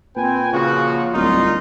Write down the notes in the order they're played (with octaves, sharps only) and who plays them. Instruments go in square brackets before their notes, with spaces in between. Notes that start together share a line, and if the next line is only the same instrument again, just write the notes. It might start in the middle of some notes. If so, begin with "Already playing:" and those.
[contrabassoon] A#2 [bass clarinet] C4 [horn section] B4 G5 G#5
[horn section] C#3 F3 F#4 [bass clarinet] F4
[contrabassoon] D1 [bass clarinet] C2 [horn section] A#2 D#4 F4